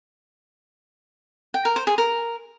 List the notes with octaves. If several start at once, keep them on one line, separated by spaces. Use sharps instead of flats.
G5
A#4
C5
G#4
A#4